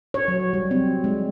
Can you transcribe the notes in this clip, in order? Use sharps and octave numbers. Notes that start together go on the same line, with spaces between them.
C#5
F#3
G3
C4
G#3